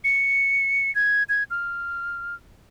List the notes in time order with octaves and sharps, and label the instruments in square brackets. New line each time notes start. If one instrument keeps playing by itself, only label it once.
[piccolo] C#7
G#6
G#6
F6